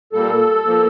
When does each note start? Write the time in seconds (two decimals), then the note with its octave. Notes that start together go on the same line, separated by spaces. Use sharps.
0.13 A#2 G3 A#3 A4
0.67 F3 A#3